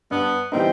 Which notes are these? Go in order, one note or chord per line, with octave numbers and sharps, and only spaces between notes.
G2 B3
E3 G3 B3 C4 D#4